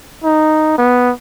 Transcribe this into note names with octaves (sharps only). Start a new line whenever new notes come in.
D#4
B3